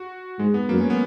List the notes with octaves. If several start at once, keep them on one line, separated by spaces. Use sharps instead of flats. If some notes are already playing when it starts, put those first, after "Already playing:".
Already playing: F#4
G#2 G#3
B3
F#2 A#3
C#4
B3